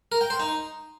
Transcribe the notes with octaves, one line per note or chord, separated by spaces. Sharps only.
A#4
G5
C5
D#4